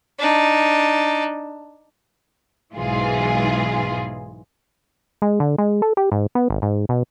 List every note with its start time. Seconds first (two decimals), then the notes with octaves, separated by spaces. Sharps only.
0.19 D4 D#4
2.75 B1 G#2 E3 G#3 F4 G#4
5.22 G#3
5.40 D3
5.58 G#3
5.82 A4
5.97 G4
6.12 G#2
6.35 B3
6.50 G#1
6.62 G#2
6.89 B2